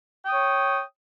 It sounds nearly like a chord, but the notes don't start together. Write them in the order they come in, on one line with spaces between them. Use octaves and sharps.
G5 D#6 C#5